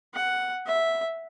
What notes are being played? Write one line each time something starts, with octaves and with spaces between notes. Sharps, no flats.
F#5
E5